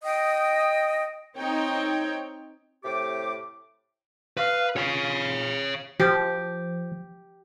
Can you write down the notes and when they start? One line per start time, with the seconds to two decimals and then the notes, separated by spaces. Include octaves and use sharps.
0.04 D#5 G5 D#6
1.36 C4 D#4 C#5 G5
2.84 A2 C3 G4 D6
4.37 B4 F5
4.76 F4 C#5 F5
6.00 F3 G4